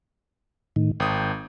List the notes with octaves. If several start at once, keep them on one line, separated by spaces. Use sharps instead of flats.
A2 D#3
G#1 G5 D#6